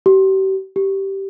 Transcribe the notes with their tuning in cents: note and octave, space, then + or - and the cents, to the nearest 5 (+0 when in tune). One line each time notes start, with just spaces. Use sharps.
G4 -35
G4 -10